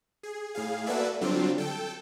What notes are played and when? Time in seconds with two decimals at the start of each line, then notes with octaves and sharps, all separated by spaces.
0.23 G#4
0.55 A2 G#4 F5
0.86 A#3 F#4 A4 B4 D5 E5
1.21 D3 F#3 G3 C4 D4 F4
1.58 A4 G5